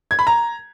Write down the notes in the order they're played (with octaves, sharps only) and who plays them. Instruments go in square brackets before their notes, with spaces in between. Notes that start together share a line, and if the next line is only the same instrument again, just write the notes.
[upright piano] G#6
B5
A#5